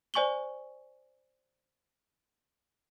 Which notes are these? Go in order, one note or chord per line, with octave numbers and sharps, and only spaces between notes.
C5 D5 G#5 C#6 F#7 G7